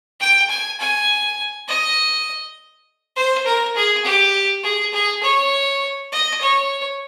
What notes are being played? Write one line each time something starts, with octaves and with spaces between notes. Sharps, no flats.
G5
G#5
G#5
D#5
C5
A#4
G#4
G4
G#4
G#4
C#5
D#5
C#5